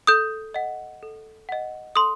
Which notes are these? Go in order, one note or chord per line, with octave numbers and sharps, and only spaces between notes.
A4 D#6 G6
D#5 F#5
A4
D#5 F#5
A4 C6 D#6